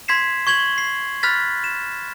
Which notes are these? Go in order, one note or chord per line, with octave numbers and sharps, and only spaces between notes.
C6 G#6 B6 C7 E7
C#6 G#6 F#7 G7
C7
B5 F6 F#6 A6 B6
E7